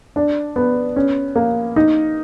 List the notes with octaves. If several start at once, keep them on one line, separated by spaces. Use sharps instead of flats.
D4
B3
C#4
A#3
D#4